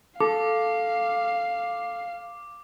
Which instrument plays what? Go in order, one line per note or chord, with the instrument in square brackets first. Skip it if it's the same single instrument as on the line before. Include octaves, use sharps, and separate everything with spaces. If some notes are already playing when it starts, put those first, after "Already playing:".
[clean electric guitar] A4 [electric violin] F5 [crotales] D6